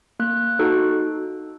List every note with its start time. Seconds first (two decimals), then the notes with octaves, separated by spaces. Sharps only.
0.20 A#3 F#6
0.59 D#4 F#4 A4